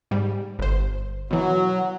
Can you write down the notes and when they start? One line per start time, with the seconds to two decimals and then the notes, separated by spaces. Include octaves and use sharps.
0.11 G#2 G3
0.59 G1 C5
1.31 B2 E3 F#3